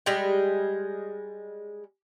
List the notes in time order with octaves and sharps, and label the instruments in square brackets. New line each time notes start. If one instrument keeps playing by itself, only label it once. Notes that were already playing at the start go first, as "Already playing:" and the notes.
[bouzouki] G3 G#3 G#4 G5